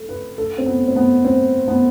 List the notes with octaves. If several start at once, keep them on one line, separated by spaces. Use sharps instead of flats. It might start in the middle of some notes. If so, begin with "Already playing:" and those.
Already playing: A4
B4
A4
C4
B3
C4
B3
C4
B3